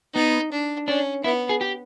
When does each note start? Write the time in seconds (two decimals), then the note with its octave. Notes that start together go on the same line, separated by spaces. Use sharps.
0.15 B3 D#4
0.52 D4
0.88 C#4 D4
1.24 B3 E4
1.49 G#4
1.61 G4